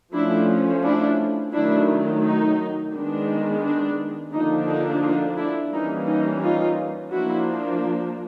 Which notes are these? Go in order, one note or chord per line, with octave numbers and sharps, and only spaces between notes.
F3 A3 C#4 D4 E4
D4 E4
D#3 F#3 A3 D4 E4
D#4
D#3 G#3 B3 D4
D4
D3 F3 A#3 D4 D#4
D#4
D#4 F4
D4 E4
E3 G3 A#3 C#4 D#4
D#4
D#4 F4
F3 A#3 D4 E4 F#4